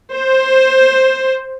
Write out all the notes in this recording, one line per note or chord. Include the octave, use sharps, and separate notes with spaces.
C5